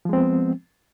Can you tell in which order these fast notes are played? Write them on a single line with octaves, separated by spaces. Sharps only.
F3 G#3 C4 B3